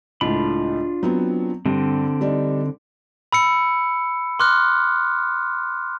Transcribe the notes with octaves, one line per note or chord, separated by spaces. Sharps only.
C#2 A2 D4 F4 B5
F#3 B3 C4
G2 D3 C4
G3 D4 D#4
B5 E6 C#7
C6 D6 F6 F#6